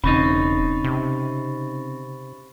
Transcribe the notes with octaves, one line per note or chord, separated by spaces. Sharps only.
E1 C#3 C4 D#4 B5 C#6 A6
C3